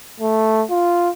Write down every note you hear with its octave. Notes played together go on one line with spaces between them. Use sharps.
A3
F4